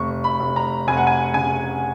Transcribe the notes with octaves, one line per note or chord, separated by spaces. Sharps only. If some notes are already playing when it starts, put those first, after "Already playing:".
Already playing: F1 C#6
B5
F1
A#5
F1 G#5
F#5
G#5
C#3 G#5